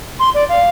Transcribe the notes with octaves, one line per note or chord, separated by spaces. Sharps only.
C6
D5
F5